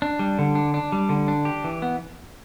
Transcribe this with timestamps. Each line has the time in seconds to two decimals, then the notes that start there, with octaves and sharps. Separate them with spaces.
0.02 D4
0.19 G3
0.39 D3
0.55 D4
0.74 D4
0.92 G3
1.09 D3
1.28 D4
1.45 G4
1.64 E3
1.82 B3